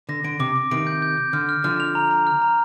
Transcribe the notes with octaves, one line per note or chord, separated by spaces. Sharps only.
D3 A#6
D3 D7
C3 D6
D6
C3 D#3 D7
G6
G6
G6
D3 F6
F6
D3 F3 F6
F7
A#5
A#5
F6
A#5